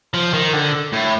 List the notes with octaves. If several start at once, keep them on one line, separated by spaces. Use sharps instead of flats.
F3
D#3
D3
A2